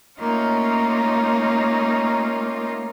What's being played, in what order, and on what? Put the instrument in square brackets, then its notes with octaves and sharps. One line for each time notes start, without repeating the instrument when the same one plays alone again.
[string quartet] A3 A#3 C#4 D#4 F4